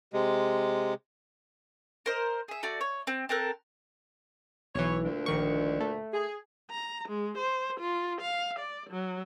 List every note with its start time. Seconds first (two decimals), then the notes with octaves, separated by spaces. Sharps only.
0.13 C3 G#3
2.06 A#4 C5 D#5
2.48 G#4 E5
2.63 A3 F#4 D5 D6
2.81 C#5
3.07 C4
3.29 C4 A4 A#4 F#6
4.75 B1 E3 C#5
5.05 D2 A#2 D4
5.26 A#1 D#3 C#6
5.80 A3
6.13 G#4
6.71 A#5
7.09 G#3
7.38 C5
7.80 F4
8.21 F5
8.59 D5
8.90 F#3